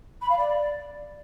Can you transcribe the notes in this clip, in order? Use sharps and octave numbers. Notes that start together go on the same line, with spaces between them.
B5
F5
D5